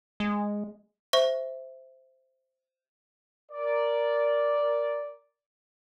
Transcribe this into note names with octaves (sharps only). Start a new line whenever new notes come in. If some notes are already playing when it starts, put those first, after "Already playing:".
G#3
C5 E5 C#6
A#4 D5